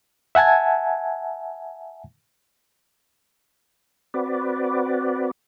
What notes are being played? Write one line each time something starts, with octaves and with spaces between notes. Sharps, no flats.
E5 F#5 G#5 A5 G#6
C4 F#4 B4 D5